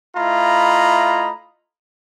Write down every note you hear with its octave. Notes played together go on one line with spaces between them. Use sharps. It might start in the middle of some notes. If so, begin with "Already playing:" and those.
A3 E4 F4 D#5 A#5 B5